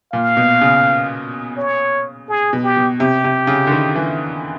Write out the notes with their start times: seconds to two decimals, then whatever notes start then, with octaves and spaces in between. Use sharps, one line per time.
0.13 A#2 F5
0.37 B2
0.61 C#3
1.57 C#5
2.29 G#4
2.53 B2
2.64 G4
2.77 B2
3.00 C3 G4
3.24 C3
3.47 C#3
3.67 D3
3.71 D#3
3.96 E3